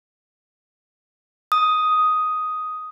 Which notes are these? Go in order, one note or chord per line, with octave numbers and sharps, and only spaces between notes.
D#6